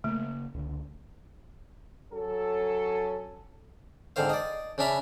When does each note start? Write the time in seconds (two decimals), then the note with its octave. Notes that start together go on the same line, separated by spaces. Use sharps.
0.04 C#3 A3 A#3
0.54 C#2 D3
2.12 F#3 C#4 A4
4.16 G#2 D3 C4 C5 F5
4.30 D5 D#5
4.78 C#3 C#4 D4 E5 A#5 B5